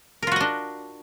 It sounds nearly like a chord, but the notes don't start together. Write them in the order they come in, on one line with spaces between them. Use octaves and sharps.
A#4 F4 F#4 D#5 D4